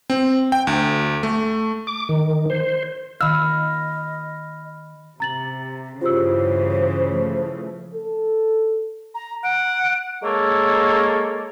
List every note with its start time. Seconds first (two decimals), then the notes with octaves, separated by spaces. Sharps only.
0.10 C4
0.52 G5
0.67 D2
1.23 A3
1.87 D6
2.09 D#3
2.50 C5
3.21 D#3 D#5 F5 B5 E6 F6
5.20 C3 A#5 A6 F#7
6.01 G2 C#3 E3 F4 G4 C5 E6
7.08 F3 A3
7.94 A4
9.15 A#5
9.44 F#5 D7
10.22 G#3 A#3 A4 C#5